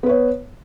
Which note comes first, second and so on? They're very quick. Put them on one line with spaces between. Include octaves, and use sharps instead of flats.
B3 B4 C#5